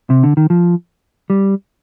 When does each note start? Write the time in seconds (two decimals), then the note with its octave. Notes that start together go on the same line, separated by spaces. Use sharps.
0.10 C3
0.23 D3
0.37 D#3
0.50 F3
1.30 G3